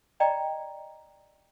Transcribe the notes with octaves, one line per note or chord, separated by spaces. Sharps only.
D5 D#5 G5 A#5 B5